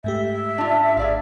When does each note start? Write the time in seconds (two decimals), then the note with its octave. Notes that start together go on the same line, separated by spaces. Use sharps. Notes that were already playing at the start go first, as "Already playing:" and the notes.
0.04 G#2 A3 G4 E5
0.58 D4 F4
0.97 A1 G#4 D5 F5